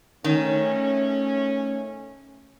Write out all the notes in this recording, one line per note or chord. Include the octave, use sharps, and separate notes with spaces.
D#3 A3 C#4